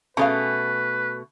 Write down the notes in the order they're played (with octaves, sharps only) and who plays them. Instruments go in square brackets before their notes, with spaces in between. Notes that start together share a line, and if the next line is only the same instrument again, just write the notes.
[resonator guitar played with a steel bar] B2 A3 [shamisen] C#4 G#4 F5 [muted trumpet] B4